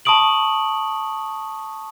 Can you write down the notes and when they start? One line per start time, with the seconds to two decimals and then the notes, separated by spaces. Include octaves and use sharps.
0.05 A5 B5 C#6 D#6 D7 F#7